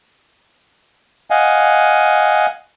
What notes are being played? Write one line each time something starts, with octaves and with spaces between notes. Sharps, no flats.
D#5 F5 F#5 G#5